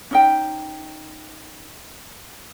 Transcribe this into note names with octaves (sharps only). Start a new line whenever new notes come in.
C#4 D#4 G5